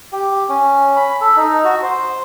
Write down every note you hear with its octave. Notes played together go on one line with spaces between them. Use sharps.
G4
C#4
B5
A4
D#4
F#4
C5